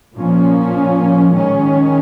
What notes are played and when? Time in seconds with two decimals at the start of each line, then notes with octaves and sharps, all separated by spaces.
0.17 A#2 F3 A#3 C#4
1.34 D#3 G#3 C#4